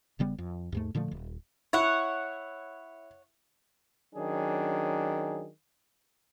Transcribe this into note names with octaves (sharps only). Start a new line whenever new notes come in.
E1 C#3 G3 B3
F2
D#2 G#2 A3
A#2 D3 F3 A3
D#1
E4 C#5 F#5
D#3 F#3 C#4 D4 G#4